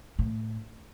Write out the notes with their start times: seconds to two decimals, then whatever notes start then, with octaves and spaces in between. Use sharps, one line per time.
0.19 A2